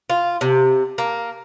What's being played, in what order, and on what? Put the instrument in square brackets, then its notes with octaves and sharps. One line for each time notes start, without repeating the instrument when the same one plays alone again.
[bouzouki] F4
C3
A#3